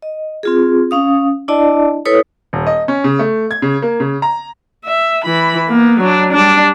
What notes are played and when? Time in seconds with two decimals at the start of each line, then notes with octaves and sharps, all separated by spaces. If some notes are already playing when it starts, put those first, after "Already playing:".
0.02 D#5
0.43 C4 F4 G#4
0.91 C#4 F5 D#6
1.48 D4 E4 D5 D#5 A5
2.05 E4 A4 B4 C#5 D#6
2.53 D#1
2.67 D#5
2.88 C#4
3.04 C#3
3.19 A3
3.51 G#6
3.62 C#3
3.82 A#3
4.00 C#3
4.22 A#5
4.85 E5
5.24 E3 B5
5.69 A#3 B3
6.00 F#3 D4
6.33 G3 D4